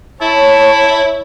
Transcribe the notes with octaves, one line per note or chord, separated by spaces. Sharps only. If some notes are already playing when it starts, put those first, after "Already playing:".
E4 C#5 A5